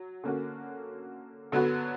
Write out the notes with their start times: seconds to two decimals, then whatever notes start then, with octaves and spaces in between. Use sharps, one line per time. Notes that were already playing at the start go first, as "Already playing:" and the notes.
Already playing: F#3
0.24 D3 A#3 C#4 F#4
1.52 D3 F#3 B3 F#4